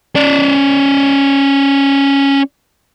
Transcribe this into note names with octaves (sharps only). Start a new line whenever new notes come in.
C#4 D5